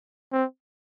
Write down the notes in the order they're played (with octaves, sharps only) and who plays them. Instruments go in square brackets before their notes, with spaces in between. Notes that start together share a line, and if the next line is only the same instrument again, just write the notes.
[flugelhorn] C4